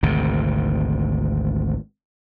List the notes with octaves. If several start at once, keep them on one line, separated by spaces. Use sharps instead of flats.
G#1 D2 C3